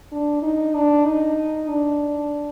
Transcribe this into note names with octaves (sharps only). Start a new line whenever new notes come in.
D4
D#4
D4
D#4
D4